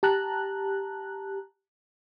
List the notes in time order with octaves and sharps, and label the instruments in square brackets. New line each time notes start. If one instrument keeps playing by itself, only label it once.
[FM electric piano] G4 A5 A#5 F#6